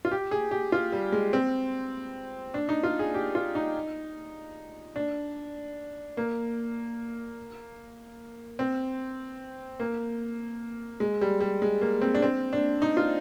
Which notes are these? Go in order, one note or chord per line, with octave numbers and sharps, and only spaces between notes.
F4
G4
G#4
G4
F4
G3
G#3
C4
D4
D#4
F4
G#4
G4
F4
D#4
D4
A#3
C4
A#3
G#3
G3
G3
G#3
A#3
C4
D4
C4
D4
D#4
F4